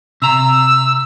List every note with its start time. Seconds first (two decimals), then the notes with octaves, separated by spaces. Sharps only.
0.22 C3 A#5 E6